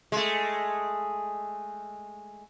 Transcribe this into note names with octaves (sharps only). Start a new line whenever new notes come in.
G#3 A3